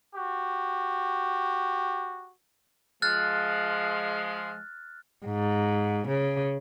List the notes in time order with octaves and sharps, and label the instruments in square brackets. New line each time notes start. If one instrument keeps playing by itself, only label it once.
[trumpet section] F#4 G4
[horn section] F3 G#3 [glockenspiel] F6 F#6 A6
[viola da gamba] G#2
C#3